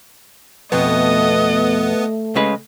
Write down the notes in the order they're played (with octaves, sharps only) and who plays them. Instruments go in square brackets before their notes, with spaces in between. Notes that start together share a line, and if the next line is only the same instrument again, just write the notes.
[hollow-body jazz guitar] F2 B2 [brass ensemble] A3 [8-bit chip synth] B3 [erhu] D#5
[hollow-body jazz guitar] C#3 G#3 B4